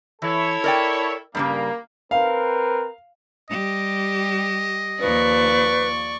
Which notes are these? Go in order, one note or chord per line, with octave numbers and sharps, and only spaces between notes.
E3 E4 A4 C#5
A#4 D5 G5
G2 C#3 G3 A#3
C4 A#4 B4 F5
G3 G4 D#5
D#2 F3 B4 D5 C#6